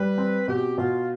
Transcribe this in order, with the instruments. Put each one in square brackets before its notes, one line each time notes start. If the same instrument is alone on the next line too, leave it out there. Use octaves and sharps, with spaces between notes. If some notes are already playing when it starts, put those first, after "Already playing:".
Already playing: [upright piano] G3 [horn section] B4
[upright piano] C4
[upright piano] B2 [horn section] G4
[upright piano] B2 [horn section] F4